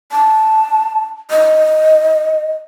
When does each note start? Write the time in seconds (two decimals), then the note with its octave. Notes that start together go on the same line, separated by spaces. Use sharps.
0.12 A5
1.30 D#5